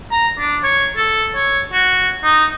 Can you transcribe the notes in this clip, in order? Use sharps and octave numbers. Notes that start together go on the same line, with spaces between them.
A#5
D4
C#5
A4
C#5
F#4
D#4